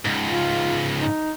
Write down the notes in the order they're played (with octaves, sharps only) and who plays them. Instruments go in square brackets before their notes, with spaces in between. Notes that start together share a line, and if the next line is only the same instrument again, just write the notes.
[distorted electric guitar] C#2 G#2
[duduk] F4
D#4